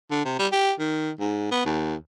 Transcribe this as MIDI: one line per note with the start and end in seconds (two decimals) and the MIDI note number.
0.11 0.24 50
0.25 0.36 48
0.39 0.47 55
0.52 0.73 67
0.80 1.11 51
1.20 1.48 44
1.52 1.63 59
1.66 1.96 39